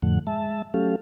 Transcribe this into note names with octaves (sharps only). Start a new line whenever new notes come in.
F2 A2 D3 F3 A3 F#5
G#3 E5 A5
F#3 A3 C#4 G4 A4 F5